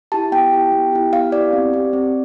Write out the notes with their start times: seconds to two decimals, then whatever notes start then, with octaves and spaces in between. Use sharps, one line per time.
0.12 E4 G4 A5
0.32 B3 G5
0.52 E4 G4
0.72 B3
0.93 E4 G4
1.13 B3 F5
1.32 E4 G4 D5
1.53 C4
1.73 G4
1.93 C4